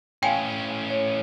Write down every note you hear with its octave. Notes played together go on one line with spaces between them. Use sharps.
A2 C#4 F5 G5 G#5 C6
C#5